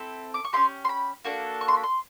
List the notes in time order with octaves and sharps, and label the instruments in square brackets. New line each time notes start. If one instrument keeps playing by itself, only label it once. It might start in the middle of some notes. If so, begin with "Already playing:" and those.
Already playing: [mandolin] C4 E4 A4
D6
C#6
C#4 E4 G4 C6
C6
B5
A#3 D4 F#4 A4
C#6
C6
B5
C6